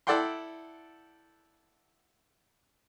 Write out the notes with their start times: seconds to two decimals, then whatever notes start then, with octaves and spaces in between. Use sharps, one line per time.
0.07 E4 A4 D5 F#5 G5 C6